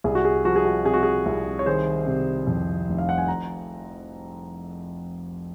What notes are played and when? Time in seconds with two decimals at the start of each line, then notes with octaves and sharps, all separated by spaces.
0.04 C2 G#4
0.15 F#4
0.25 G#4
0.45 F3 F#4
0.56 G#4
0.65 F#4
0.85 C3 G#4
0.94 F#4
1.03 G#4
1.26 C2
1.59 C#5
1.66 D#3 G#4 C5
2.07 C3
2.47 F2
2.88 F1
2.98 F5
3.09 F#5
3.18 G#5
3.28 A#5